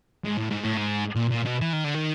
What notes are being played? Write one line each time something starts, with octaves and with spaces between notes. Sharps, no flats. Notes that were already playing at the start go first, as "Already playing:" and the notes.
G#2
A2
G#2
A2
G#2
A#2
A#2
B2
E3
D#3
D3
D#3